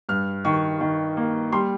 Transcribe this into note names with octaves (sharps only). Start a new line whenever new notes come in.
G2 F6
D#3 C#6
D#3
A#3
G3 C6